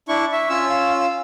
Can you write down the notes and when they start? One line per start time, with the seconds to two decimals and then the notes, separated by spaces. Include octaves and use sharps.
0.08 D4 E4 C#6
0.32 E5 C#6
0.50 C#4 F4 C#5 E6
0.68 F5
0.99 F5